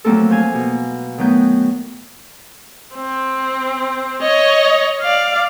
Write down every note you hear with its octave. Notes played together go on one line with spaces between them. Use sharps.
F3 F#3 A3 A#3 C4 A4
C5 F5 G#5
B2
D#3 F#3 A3 B3 G6
C4
C#5 D#5
D5 F5